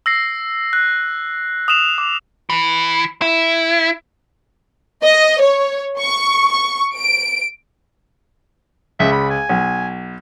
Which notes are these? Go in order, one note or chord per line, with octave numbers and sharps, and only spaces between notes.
E6 A#6 C7
F#6
D#6 E6 E7 F7
D6
E3
E4
D#5
C#5
C#6
C#6
D7
C#2 C#3 E5
B5
G#5
B1